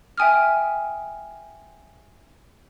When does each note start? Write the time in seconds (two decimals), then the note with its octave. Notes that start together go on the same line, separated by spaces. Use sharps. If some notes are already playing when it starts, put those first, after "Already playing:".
0.17 E5 G5 G#5 D#6 F6